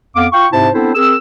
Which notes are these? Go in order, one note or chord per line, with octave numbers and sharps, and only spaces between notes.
F2 B3 F5 D6
F4 F5 G5 C#6
G#2 C3 C4 E4 C5 A5
B3 C4 D4 E4 A4 C5
C4 G#4 A#4 E6